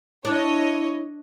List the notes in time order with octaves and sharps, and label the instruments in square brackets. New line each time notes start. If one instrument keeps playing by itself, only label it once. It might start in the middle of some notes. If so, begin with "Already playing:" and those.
[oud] D4 [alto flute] E4 [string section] C#5 D#5